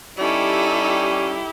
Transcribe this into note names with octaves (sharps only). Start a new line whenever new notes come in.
G3 C#4 D#4 E4 G4 A4